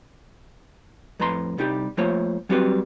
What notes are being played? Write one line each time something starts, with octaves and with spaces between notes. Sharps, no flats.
F2 A2 B4 A#5 C6
C2 G3 D#4 G4
F3 A3 A#3 F4 C5 C#5
F#3 G3 C4 F#4 G4 B4